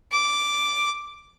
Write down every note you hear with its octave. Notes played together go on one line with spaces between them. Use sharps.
D6